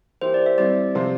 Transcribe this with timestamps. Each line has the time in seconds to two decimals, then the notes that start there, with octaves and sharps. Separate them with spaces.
0.21 E3 A#3 E4 G4 C5
0.34 D5
0.46 E5
0.58 G3 C4 E4 D5
0.95 C3 F3 C4 F4 C5